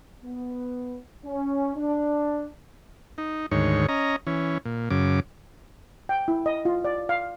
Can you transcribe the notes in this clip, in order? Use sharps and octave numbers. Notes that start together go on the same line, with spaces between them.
B3
C#4
D4
D#4
D2 G#2 D#3 C#5
C#4 D#5 A#5
E3 C#4
A#2
F#2 C#3 D6
G5
E4
D#5
F4
D5
F5